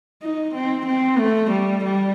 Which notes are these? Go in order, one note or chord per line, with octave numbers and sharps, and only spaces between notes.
D#4
C4
C4
A3
G3
G3